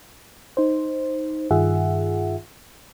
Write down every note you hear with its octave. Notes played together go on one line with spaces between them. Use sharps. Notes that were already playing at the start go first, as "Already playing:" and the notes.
D#4 C5
G2 D#3 F4 G#4 E5 F#5